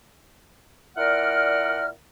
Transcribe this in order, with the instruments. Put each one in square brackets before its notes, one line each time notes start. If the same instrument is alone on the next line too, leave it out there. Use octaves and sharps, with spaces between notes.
[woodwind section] A#2 E4 A#4 D5 F#5 F6